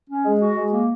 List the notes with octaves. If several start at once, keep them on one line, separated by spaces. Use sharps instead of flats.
C#4
G#3
F#4
G#3
A#3